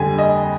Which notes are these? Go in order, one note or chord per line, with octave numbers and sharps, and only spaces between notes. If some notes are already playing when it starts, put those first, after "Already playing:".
Already playing: F2 D3 G3 G#5
D#5